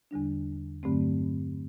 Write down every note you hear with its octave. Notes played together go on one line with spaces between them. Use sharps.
E2 D3 G3 D4
G2 D3 F#3 A3 C4